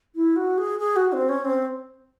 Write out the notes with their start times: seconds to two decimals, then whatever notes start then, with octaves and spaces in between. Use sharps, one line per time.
0.16 E4
0.36 F#4
0.58 G#4
0.79 G#4
0.96 F#4
1.13 C4
1.29 C#4
1.45 C4